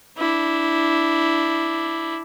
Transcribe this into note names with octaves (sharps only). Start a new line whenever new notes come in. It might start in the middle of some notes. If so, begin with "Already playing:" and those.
D4 E4